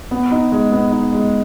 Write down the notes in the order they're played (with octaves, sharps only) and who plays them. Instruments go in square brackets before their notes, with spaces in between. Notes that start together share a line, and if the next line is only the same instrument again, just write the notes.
[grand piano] B3
D#4
G#3
B3
D#4
G#3